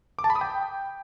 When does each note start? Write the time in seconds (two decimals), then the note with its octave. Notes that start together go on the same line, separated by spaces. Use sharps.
0.19 D6
0.24 A5
0.30 B5
0.36 D#6
0.41 G5